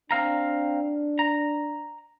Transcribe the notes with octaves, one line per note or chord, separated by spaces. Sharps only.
C4 D4 F5 A#5
A#5